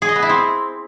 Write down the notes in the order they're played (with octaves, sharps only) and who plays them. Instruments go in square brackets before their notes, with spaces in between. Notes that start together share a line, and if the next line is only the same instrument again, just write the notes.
[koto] G#4
D#5
B3
E4
C4